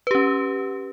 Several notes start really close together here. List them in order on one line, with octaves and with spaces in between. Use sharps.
B4 G4 C#4